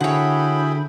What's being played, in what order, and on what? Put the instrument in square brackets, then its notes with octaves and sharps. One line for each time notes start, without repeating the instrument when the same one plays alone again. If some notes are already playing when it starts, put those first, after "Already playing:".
[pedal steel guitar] D3 [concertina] E4 G#4 [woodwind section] F#4 G5 B5 [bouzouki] C#5 F#5